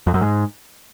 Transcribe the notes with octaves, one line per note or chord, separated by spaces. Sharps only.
F2
F#2
G#2